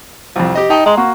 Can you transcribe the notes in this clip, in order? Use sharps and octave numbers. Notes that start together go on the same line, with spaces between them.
C2 F2
G4 D#5
D#4 G5 A5
G#3 A#5 C6
A#3 F#4